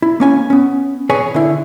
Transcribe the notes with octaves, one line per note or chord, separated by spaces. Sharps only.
E4
A#3 C#4 G#5
B3 C#4
G#4 B4 C#5 G#5
D3 E4